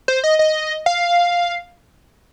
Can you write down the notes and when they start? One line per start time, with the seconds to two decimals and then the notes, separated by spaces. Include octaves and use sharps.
0.08 C5
0.24 D#5
0.39 D#5
0.86 F5